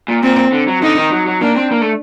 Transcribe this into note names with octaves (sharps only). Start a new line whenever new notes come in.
A#2
A#2 C4
D3
F#3
D3 D#4
D#3
F#3
F#3
A#3 D4
C4
A#3
A3